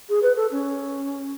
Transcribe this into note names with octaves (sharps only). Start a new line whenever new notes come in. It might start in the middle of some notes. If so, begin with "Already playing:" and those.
G#4
B4
A4
C#4